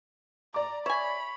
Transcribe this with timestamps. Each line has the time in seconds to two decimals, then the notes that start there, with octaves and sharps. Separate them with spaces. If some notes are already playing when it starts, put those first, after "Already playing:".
0.54 D5 A#5 D6
0.86 C#5 E5 G#5 B5